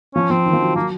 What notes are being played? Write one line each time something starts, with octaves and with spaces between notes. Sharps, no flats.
F3 C#4
F3 C4
D#3
F3
F#3
F#3 A#3